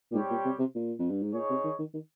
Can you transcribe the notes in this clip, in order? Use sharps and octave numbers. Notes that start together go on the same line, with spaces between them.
A#2
G#2 G3 C4 G4 C#5 G5
A#2
C3
C3
A#2
F2
G2
G#2
A#2 D#4 G#4 C#5
C3
D#3
D#3
D#3